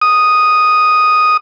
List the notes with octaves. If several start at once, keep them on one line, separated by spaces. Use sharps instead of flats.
D#6